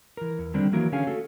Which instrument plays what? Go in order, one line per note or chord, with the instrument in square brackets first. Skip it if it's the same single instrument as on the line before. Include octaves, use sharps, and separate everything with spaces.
[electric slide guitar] E3 A#4
E2
D3 D#3 G3 C4 D4
D#3 E3 F#3 A#3 F#4 A#4
D3 C#4 G#4 C#5 F5 G#5
A3 F#4 A4